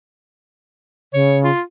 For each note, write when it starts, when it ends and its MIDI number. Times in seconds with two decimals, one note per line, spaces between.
1.13 1.51 49
1.13 1.38 73
1.44 1.61 65